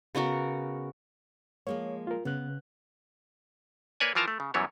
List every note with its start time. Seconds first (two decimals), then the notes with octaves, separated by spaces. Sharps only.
0.15 C#3 B3 F#4 A#4
1.67 F3 G#3 A#3 C#5
2.07 F4 A#4
2.25 C#3 B3 F#6
4.00 A#3 B4 C#5 D5 G#5
4.15 E3 F3 F4 A#4 A5 A#5
4.28 A3
4.40 C#3
4.54 F#2 E3 F#3 G3 B3 C#5